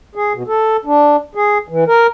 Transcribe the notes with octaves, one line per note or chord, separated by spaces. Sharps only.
G#4
B2
A4
D4
G#4
E3
A#4